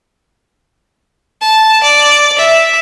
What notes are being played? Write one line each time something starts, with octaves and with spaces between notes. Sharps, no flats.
A5
D5
E5